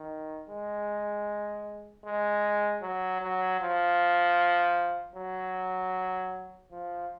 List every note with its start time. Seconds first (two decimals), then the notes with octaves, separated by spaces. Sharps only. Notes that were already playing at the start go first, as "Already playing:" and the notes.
Already playing: D#3
0.49 G#3
2.05 G#3
2.82 F#3
3.21 F#3
3.61 F3
5.15 F#3
6.71 F3